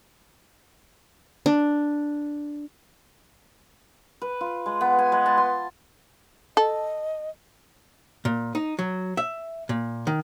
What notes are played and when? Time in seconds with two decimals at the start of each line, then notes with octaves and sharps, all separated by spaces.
1.46 D4
4.22 B4
4.41 F4
4.66 G#3
4.81 B3
4.99 G#5
5.12 G#3
5.26 A5
5.38 C6
6.57 A4 D#5
8.25 A#2
8.55 D#4
8.79 F#3
9.17 E5
9.69 A#2
10.07 D#3